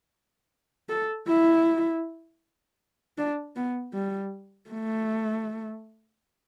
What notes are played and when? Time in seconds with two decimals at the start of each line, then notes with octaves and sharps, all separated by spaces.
0.89 A4
1.27 E4
3.18 D4
3.56 B3
3.94 G3
4.70 A3